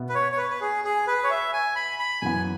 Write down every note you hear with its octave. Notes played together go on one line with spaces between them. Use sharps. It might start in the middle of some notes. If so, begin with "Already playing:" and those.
Already playing: B2 B3 E5
B4
C#5
C#5
B4
B4
G#4
G#4
B4
C#5
E5
G#5
B5
B5
F#2 E3 B3 G#5